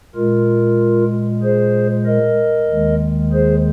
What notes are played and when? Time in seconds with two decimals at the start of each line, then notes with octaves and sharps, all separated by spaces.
0.15 A#2 G#3 F4 A#4
1.42 G#4 C5
2.06 A#4 D#5
2.69 D#2 D#3 G#3
3.32 G#4 C5